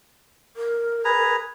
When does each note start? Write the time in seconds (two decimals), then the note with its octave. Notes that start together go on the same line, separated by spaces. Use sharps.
0.56 A#4
1.05 G#4 B4 A#5